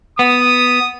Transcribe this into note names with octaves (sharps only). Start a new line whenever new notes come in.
B3 D#6